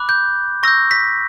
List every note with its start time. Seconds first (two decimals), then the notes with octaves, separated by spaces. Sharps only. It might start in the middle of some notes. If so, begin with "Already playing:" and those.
Already playing: B5 D6 F#6
0.09 G6
0.63 C#6 E6 G6 A#6
0.91 B6